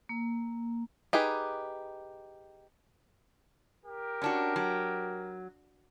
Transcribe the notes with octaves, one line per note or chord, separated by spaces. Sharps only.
A#3
D#4 G4 G#4 B4
G4 A#4
C#4 D4 F#4
F#3